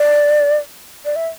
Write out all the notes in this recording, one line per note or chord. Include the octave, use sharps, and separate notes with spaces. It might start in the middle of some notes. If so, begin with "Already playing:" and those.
Already playing: D5
D5
E5